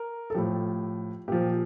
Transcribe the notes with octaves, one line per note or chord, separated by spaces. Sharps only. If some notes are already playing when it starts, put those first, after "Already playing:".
Already playing: A#4
A4
A2 F3 G4
A#2 F3 G4